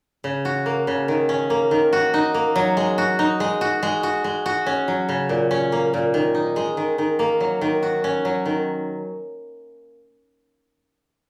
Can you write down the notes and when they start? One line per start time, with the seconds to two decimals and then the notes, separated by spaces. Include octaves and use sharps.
0.24 C#3
0.45 F#4
0.66 A#3
0.87 C#3
1.08 D#3
1.29 C#4
1.50 A#3
1.71 D#3
1.93 F#4
2.14 D#4
2.34 A#3
2.56 F#3
2.77 G#3
2.98 F#4
3.19 D#4
3.40 G#3
3.61 F#4
3.83 G#3
4.03 F#4
4.24 G#3
4.46 F#4
4.66 C#4
4.88 F#3
5.09 C#3
5.29 A#2
5.51 C#4
5.72 A#3
5.94 A#2
6.14 D#3
6.35 D#4
6.56 G#3
6.77 D#3
6.98 D#3
7.19 A#3
7.41 F#3
7.61 D#3
7.83 F#4
8.04 C#4
8.25 F#3
8.46 D#3